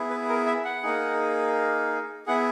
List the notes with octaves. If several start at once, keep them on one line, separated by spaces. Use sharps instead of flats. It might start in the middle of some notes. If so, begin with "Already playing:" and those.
Already playing: B3 E4 G#4
B4
A#4
E5
F#5
A#3 D#4 G#4
B3 E4 G#4 F#5